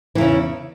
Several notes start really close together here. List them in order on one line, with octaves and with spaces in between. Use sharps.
E3 E2 C#3